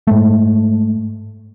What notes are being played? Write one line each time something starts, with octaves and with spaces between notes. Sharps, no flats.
G#2 G#3 A3